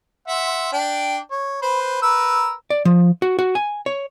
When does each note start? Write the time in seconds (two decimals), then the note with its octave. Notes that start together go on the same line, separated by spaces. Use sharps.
0.28 E5 F#5 C6
0.73 D4 D5 G5
1.31 C#5
1.62 B4 C5
2.02 A#4 B4 E6
2.70 D5
2.85 F3
3.22 F#4
3.39 F#4
3.55 G#5
3.86 C#5